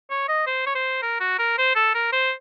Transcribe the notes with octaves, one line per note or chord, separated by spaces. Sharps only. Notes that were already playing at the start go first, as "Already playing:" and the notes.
C#5
D#5
C5
C#5
C5
A#4
F#4
A#4
C5
A4
A#4
C5